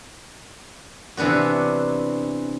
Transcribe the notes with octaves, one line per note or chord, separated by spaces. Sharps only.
C3 E3 B3 D4 F#4